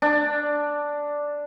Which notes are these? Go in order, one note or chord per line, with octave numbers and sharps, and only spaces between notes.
D4